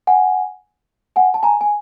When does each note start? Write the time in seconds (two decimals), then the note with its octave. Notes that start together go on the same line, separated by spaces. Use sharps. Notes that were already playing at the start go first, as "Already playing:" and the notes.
0.07 F#5 G#5
1.16 F#5 G#5
1.34 A5
1.43 G#5 A#5
1.61 G#5